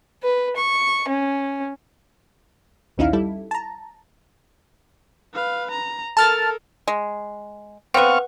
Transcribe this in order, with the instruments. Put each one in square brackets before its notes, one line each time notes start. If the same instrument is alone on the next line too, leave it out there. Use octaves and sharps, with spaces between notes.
[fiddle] B4
C#6
C#4
[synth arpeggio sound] A#1 D#2 C#4 D#4 E4 F5
G3 E4 A4
A5 A#5
[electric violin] B4 F5
A#5
[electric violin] A4 A#4 [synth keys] A5 F6 A6
[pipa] G#3
[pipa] B3 C4 [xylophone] B4 F#5 [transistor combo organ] F5 C#6